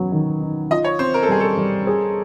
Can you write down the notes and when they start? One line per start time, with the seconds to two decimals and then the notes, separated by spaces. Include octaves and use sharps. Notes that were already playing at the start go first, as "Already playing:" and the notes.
Already playing: F#3 B3
0.12 D#3
0.41 D#4
0.71 F4 D#5
0.84 C#5
0.99 C4 C5
1.14 A#4
1.23 A4
1.28 G3 G#4
1.40 A4
1.58 G3
1.87 G#4